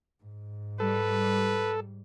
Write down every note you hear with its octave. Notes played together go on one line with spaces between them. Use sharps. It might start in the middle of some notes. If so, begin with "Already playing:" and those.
G#2
G3 A4 B4